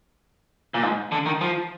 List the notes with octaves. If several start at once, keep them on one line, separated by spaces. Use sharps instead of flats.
A#2
G#2
D3
D#3
F3